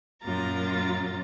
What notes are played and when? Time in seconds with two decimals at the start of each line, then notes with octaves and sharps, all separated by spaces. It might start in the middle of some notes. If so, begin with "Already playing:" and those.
0.23 F#2 A#2 A#3 F4 A#5 A6